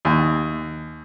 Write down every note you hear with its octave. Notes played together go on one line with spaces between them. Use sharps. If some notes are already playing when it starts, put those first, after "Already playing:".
D#2